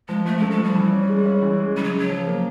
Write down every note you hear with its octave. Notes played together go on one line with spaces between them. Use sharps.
F3 G#3
F3 A3
G#3
A3
G#3
F3 G3
E3
C#4
G#3
C#4
E3
G#3
C#3 G3
F#3
C#3
F#3
F3
A#3